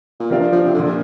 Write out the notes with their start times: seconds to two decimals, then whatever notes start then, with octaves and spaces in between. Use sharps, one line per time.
0.20 A#2
0.30 C3 F3 D4 A#4 D5 F5
0.52 F3
0.65 C3
0.74 A#2 D3 F3 D4